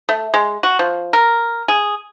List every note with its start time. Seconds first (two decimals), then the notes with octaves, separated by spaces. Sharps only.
0.09 A3
0.34 G#3
0.63 F#4
0.79 F3
1.13 A#4
1.68 G#4